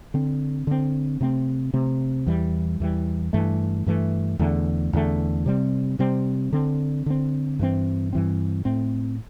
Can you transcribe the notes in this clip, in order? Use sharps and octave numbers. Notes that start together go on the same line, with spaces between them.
D3 C4
D3 C4
C3 A3 C4
C3 A3 C4
E2 E3 G3
E2 E3 G3
G2 E3 A3
G2 E3 A3
E2 D3 A3
E2 D3 A3
C3 G3 C4
C3 G3 C4
D3 C4
D3 C4
G2 E3 C4
G2 E3 C4
A2 A3 C4